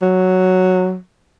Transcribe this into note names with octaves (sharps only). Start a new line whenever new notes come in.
F#3